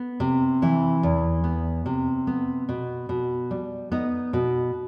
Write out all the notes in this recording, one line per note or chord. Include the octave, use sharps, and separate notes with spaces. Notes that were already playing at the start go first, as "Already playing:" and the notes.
Already playing: B3
C3
E3 E4
E2
B3
C3
B3
B2
B2
G3
B3 D#4
B2